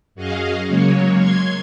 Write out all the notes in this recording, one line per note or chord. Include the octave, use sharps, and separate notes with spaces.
F#2 F#4 G#4 D#5 F5
C#3 F#3 G#3 A#3 C#5
C6 G#6